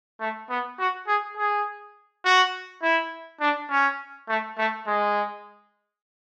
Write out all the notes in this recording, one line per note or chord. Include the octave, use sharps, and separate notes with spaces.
A3
B3
F#4
G#4
G#4
F#4
E4
D4
C#4
A3
A3
G#3